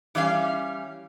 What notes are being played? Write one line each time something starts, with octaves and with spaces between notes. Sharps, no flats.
E3 G3 C#4 F5